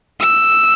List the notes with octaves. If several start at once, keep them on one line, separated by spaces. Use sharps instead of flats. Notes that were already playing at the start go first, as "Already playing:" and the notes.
E6